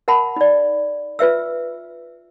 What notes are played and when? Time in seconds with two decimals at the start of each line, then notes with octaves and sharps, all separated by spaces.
0.08 A#4 F#5 A5 B5
0.36 D#4 D5
1.19 F4 B4 E5 E6